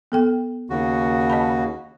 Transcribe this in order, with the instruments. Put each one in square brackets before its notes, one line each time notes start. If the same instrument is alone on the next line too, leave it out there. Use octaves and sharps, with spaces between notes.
[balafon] B3 A4 G5
[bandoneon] D#2 C#3 F#4
[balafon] D#5 A5 B5